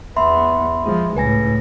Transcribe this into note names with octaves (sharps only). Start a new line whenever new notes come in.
E2 B3 E5 B5 C6
F3 G#3
C#2 A2 B4 G#5 A#6